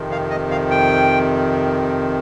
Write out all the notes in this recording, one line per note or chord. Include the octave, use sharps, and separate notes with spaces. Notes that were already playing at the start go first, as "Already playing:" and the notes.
Already playing: F2 C3 D#3
F5
D#5
F5
G5